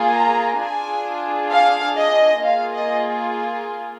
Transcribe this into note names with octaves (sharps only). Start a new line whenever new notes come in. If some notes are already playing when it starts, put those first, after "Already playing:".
Already playing: A#3 F4 G#4
A#5
D4 F4 G#4 G#5
F5
D#5
A#3 F4 G#4 F5
D#5